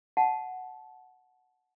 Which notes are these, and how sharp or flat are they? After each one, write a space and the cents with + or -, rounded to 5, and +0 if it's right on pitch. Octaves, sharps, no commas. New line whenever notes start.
F#5 +0 A5 -20